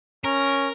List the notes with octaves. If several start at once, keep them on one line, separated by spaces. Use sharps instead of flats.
C#4 A#4